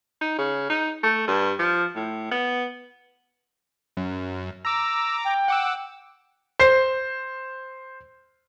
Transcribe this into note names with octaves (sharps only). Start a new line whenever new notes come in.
D#4
C#3
D#4
A3
G2
F3
A2
B3
F#2
A#5 D6 E6
G5
F#5 D6 E6
C5 C7